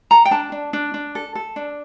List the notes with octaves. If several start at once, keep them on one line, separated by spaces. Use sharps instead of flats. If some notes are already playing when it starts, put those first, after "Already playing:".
A4 A#5
G5
D4 A5
D4
D4
D4
A4
A4
D4